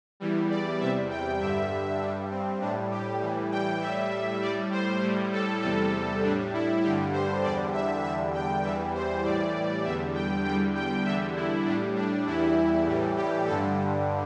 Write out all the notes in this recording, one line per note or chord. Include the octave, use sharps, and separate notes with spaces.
E2 E3 G3
D5
E2 C3 G3 E5
G5
G2 D3 G3 E5
G2 G3 D4
C4
A2 G3 D4
G4
A2 E3 G3
G5
A2 G3 E5
A2 G3 D5
C5
A2 G3
A4
E2 C3 G3 A4
A2 G3 D4
E4
G2 D3 G3 G4
C5
E2 D3 G3 D5
E5
E2 D3 G3 E5
G5
E2 E3 G3 E5
C5
A2 E3 G3 D5
E2 D3 G3 E5
G5
E2 D3 G3 G5
G5
E2 D3 G3 E5
E4
A2 G3 D4
D4
E2 E3 G3 E4
A2 E3 G3
G4
G2 D3 G3 A4